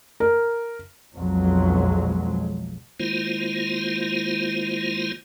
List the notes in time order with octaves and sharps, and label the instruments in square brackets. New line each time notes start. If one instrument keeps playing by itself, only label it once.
[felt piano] A#4
[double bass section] B1 F2 F#3 G#3
[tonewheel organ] D#3 G#3 A#3 E4 F4 C5